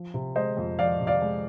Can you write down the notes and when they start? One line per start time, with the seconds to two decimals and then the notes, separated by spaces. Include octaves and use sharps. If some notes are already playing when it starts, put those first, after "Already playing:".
Already playing: F3
0.14 C3
0.36 G#3 C5 D#5
0.57 F2
0.79 F3 D5 F5
1.01 C3
1.07 D5 F5
1.22 G#3